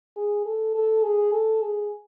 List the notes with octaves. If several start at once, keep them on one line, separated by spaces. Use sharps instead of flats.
G#4
A4
A4
G#4
A4
G#4